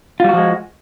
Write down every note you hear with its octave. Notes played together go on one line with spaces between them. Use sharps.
F3 G3 G#3 F4 F#4